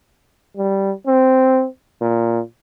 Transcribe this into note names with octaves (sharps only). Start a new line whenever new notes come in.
G3
C4
A#2